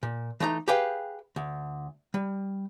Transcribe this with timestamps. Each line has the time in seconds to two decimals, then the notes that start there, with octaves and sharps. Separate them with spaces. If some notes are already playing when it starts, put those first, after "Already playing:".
0.03 A#2
0.40 E3 A3 D#4 A#5
0.68 G4 G#4 B4 F5 G5
1.36 D2
2.14 G3